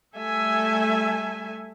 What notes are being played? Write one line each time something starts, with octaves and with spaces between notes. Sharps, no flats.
G3 A3 A4 E5 G#5